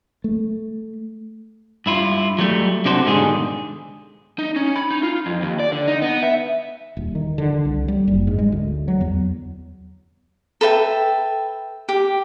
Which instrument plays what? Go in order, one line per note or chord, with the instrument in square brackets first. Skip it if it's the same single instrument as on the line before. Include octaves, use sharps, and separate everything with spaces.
[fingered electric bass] A3
[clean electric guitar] G2 E4 F4
F#3 G3 A3
C3 D4 F#4 A4 C5
G#2 B2 D3 D#3 G3 G#4
[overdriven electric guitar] D#4
C#4
B5
D#4
F4
F2
D#2
D5
D3
D#4
B3
E5
[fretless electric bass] D#1
D#3
D3
C2
G3
F#1
G#2
G#3
D2
F#3
E2
[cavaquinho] A4 B4 E5 G5
G4